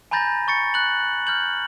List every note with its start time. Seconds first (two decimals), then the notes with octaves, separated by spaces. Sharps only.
0.11 G#5 A#5 B5 G6 A6 A#6
0.48 C#6 A6 C#7
0.74 F#6 F#7
1.27 F6 G6 F#7